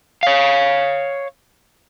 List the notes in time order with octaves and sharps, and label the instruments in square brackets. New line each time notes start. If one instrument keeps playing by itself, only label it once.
[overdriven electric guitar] C#5 F5